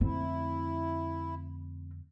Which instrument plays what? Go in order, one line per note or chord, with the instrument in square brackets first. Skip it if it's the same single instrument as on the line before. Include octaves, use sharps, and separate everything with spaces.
[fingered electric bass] F2 D3 A3 [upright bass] C4 [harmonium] E4